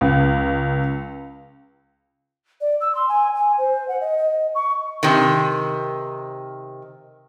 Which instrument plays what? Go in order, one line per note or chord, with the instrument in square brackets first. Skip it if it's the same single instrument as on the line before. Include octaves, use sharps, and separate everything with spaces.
[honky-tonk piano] C#2
[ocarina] D5
E6
C6
G#5
G#5
C5
F#5
D#5
D#5
C#6
[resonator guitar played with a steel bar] C3 D#3